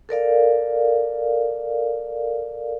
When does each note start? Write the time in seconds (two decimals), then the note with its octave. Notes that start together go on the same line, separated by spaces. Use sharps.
0.09 A4 A#4 D5 F5